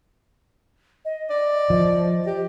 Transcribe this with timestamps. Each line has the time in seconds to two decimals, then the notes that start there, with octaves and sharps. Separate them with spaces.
1.05 D#5
1.30 D5
1.70 F3 D#5
1.97 D#5
2.27 G4